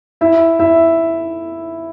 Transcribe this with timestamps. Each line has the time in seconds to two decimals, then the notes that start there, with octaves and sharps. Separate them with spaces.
0.21 E4 E5
0.60 E4 E5